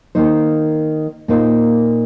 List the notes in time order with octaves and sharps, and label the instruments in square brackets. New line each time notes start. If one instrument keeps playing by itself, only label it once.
[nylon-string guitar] D#3 A#3 D#4 C5
A#2 A#3 D#4 C5